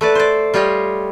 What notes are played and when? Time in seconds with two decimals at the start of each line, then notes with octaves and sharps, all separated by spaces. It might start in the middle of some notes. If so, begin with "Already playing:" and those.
0.01 A3 B4 D5
0.15 C5 D5
0.54 G3 F4 G4 C#5 D#5